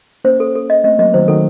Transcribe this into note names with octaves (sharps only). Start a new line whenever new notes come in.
A#3 C#4 C5
A4
A4
D#5
A3 C4 D#5
F#3 A#3 D#5
D#3 F#3 C5
D#3 F#3 A4